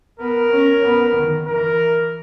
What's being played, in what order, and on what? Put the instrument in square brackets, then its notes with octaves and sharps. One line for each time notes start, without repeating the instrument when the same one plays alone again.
[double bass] B3 [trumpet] A#4
[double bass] C#4
B3
D#3
[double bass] E3 [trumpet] A#4